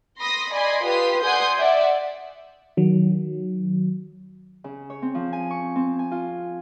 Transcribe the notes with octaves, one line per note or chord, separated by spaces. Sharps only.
B5 C6 D#6 A#6
D5 D#5 G#5 B5 C6
F4 G4 B4 C6 D#6 B6
D5 F#5 G#5 C6 D#6 G6
D5 E5 F#5
D#3 F#3
C#3
C#5
C4
F3
G#5
C#6
C4
G#5
F4